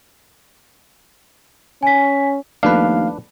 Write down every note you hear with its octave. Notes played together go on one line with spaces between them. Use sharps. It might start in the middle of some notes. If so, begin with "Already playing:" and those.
C#4 G#5 B6
D#2 F3 A3 B3 D4 B4 F5